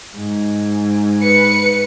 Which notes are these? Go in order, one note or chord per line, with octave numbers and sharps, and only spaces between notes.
G#2
B4 C#7